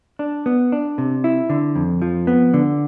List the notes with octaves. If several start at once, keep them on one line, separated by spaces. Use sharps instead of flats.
D4
B3
D4
C3
E4
D3
F2
F3
B3
D3